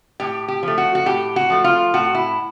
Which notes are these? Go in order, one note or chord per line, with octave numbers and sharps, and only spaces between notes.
A2 G4
G4
F3 A3
F#4
F#4
A2 G4
F#4
F3 A3
F4
A2 F#4
E4